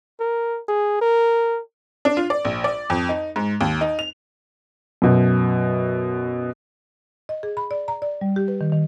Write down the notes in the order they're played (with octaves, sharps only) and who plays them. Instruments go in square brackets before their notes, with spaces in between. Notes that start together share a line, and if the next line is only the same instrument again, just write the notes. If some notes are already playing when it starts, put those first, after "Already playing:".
[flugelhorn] A#4
G#4
A#4
[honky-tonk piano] D4
F4
D5
A#1
D5
F2
D#4
G#2
D#2
D#4
F7
[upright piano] F#2 B2
[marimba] D#5
G#4
B5
D5
A#5
D5
G3
G4
B4
D#3
D#3